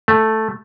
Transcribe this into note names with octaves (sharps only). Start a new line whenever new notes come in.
A3